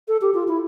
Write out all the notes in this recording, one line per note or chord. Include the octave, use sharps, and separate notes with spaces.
A4
G4
F4
E4